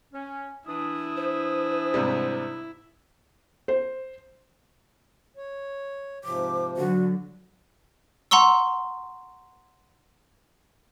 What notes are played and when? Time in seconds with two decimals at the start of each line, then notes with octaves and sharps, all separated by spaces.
0.12 C#4
0.67 E3 D4 E4 D#6
1.17 C5
1.94 G#2 C3 G3
3.68 C5
5.37 C#5
6.24 G#2 C3 F3 D6
6.77 D3 F#3 F#4
8.31 F#5 A#5 C6 C#6 E6